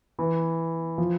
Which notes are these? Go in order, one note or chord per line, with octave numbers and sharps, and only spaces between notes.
E3
F3